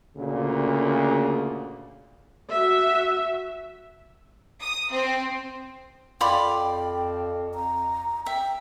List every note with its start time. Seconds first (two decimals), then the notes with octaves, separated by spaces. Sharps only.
0.16 D2 A#2 C#3
2.50 F#4 E5
4.60 D#6
4.92 C4
6.21 F2 F4 D5 G5 B5
7.54 A#5
8.26 E5 G5